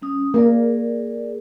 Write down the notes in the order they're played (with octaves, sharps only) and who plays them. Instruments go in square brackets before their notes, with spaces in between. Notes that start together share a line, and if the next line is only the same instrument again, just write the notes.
[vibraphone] G3 C#4 D#6
[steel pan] A#3 [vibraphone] G#4 A#4 D5